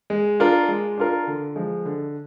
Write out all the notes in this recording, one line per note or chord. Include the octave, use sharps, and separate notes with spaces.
G#3
D4 F4 A#4
G#3
D4 F4 A#4
D3
F3 G#3
D3